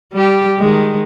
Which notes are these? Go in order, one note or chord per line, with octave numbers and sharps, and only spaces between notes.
G3 G4
D#3 G#3